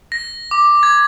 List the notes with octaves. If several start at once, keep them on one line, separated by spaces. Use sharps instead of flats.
A#6
D6
G#6